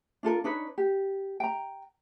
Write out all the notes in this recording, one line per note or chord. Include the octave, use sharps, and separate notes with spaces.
D4 F4 A4 A#4
D4 D#4 B4 C#5
G4
G5 A#5